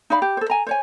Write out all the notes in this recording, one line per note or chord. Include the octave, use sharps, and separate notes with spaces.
D#4 D5 F5 B5
G4
A4 C5
G#5 A#5
C5 C#5 G#5